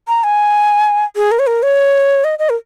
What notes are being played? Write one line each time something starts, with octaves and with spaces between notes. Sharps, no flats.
A#5
G#5
G#4
A#4
C#5
A#4
C#5
D#5
D#5
A#4